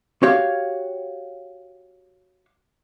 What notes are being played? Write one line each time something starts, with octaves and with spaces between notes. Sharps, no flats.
F#4 G4 C#5 F5